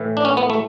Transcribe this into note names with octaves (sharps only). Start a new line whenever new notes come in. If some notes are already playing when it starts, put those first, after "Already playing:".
Already playing: A2 E3
D4
C#4
B3
A3